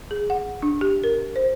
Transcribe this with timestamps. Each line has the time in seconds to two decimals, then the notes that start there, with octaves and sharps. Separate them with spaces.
0.11 G#4
0.30 F#5
0.62 D4
0.81 G4
1.04 A#4
1.36 C5